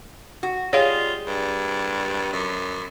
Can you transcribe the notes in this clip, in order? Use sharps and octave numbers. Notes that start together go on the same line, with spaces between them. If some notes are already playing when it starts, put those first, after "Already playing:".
F#4
G3 G#3 F4 G#4 C#5 F5
G2
F#2